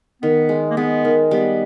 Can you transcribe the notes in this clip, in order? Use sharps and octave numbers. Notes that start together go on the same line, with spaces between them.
D#3 B3
G#3
A#3
G#3 B3
D#3
G3 B3